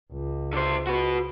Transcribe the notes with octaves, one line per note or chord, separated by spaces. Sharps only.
C#2
D3 C5
F#4 B4